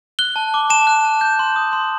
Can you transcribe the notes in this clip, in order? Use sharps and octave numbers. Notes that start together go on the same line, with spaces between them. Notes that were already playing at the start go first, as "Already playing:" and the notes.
F#6 G7
A5
D6
A5 E7
F#6
A5
G6
C6
D#6
C6